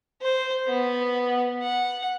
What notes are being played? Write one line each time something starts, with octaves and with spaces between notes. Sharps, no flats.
C5
B3
F#5